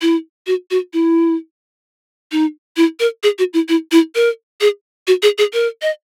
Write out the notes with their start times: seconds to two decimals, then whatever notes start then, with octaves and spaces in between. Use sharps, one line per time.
0.02 E4
0.47 F#4
0.71 F#4
0.93 E4
2.32 D#4
2.77 E4
3.00 A#4
3.23 G#4
3.39 F#4
3.53 E4
3.69 E4
3.92 E4
4.15 A#4
4.61 G#4
5.07 F#4
5.22 G#4
5.38 G#4
5.53 A#4
5.82 D#5